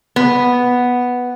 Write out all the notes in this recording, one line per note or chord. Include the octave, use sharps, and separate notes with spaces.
B3